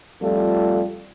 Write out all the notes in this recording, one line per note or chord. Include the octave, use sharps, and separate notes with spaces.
F2 G3 A3 F4 A4